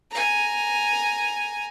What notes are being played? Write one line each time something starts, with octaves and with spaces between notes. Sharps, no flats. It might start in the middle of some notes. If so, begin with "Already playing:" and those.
G#5 A#5